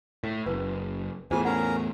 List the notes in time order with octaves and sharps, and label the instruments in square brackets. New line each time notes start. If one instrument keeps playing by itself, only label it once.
[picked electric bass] A2
[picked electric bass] F#1 [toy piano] B4
[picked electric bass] E2 A2 [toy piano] F4 G#4 C5 [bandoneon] G#5
[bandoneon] C#4 A#4 A#5 [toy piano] F#5